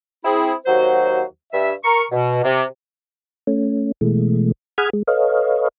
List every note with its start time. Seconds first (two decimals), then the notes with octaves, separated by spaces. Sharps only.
0.25 C4 E4 G#4
0.66 D#2 F#3 F#4 C5
1.53 G2 E5
1.84 A#4 C#6
2.12 B2
2.44 C3
3.47 A3 C#4
4.01 B2 E3 G#3 A3
4.78 G#4 F#5 B5 D#6 F6 G#6
4.93 G#3
5.07 A4 B4 C#5 D#5 F5